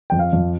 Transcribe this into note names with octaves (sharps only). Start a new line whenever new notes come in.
F2 G5
F5
F2